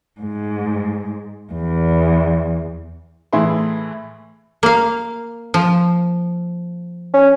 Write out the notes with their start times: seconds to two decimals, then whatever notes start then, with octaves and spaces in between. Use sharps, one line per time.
0.21 G#2
1.54 E2
3.33 A2 E3 E4 G#4 B4 C6
4.63 A#3 F5
5.54 F3
7.14 C#4